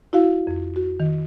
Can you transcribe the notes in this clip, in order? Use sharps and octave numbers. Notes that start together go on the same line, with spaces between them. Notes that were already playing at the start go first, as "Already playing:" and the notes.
E4 F#4 F5
F2
F#4
D#3